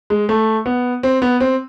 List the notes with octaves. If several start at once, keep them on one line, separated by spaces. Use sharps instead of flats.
G#3
A3
B3
C4
B3
C4